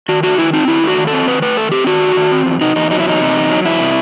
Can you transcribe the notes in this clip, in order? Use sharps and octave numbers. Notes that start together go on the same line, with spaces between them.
D#3 F#4
A3 F#4
D#3 E4
C4 D#4
D#3 E4
A3 F#4
D#3
A4
C4
D#3 B4
A3 B4
D#3 A4
C4 G4
D#3 F#4
A3
D#3
C4
E2
C3 D#4
E2 D#4
F#3 D#4
E4
E2 D#4
C3
E2
F#3
E2 E4
C3